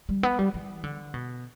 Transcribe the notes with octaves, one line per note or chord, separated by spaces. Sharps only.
G3
B3
G3
E3
D3
B2